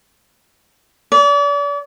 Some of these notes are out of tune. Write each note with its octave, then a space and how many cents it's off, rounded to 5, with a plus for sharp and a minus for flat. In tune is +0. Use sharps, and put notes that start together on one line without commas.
D5 -40